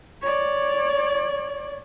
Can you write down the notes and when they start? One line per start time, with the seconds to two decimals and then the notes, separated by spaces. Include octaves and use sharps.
0.22 C#5 D5